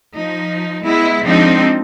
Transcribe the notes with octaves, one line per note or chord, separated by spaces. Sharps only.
F3 D#4
G#3 B3 E4
F3 G#3 C4 D4 D#4